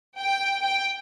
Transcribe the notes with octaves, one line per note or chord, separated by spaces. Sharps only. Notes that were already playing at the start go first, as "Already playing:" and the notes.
G5
G5